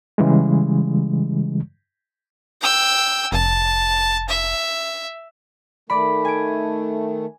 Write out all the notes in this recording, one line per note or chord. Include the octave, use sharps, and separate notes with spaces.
C#3 E3 G3 G#3
G5 E6
F1 A5
E5
D#3 A3 D5 B5
G#5 D7